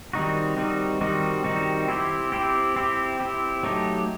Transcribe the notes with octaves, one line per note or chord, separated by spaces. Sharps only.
D#3 G3 C4 D#4 F#4
D#3 G3 C4 D#4 F#4
D#3 G3 C4 D#4 F#4
D#3 G3 C4 D#4 F#4
C4 E4 G4
C4 E4 G4
C4 E4 G4
C4 E4 G4
F#3 A3 D#4 G4